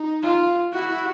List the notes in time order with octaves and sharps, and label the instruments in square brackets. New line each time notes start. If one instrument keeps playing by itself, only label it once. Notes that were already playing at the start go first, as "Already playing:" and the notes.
Already playing: [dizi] D#4
[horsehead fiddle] F4
[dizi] E4 [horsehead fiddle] F#4
[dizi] E4